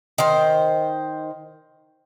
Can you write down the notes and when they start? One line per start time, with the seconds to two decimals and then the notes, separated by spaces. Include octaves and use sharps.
0.18 D#3 C5